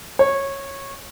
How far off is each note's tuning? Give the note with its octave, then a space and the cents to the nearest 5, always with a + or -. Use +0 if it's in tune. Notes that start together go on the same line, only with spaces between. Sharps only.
C#5 -15